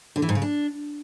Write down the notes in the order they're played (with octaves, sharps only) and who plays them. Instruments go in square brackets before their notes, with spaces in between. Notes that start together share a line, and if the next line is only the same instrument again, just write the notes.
[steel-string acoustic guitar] D3
E3
G#2
C#3
D4